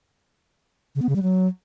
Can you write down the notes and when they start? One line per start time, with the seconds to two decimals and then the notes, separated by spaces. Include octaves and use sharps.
0.95 C#3
1.02 B3
1.09 C#3
1.16 G3
1.23 F#3